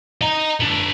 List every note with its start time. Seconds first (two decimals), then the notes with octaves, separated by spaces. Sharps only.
0.21 D#5 A#5
0.60 B3 D4